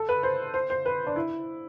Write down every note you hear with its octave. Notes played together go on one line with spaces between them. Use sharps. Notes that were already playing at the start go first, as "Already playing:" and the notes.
Already playing: A4
B4
C5
C5
C5
B4
D4
E4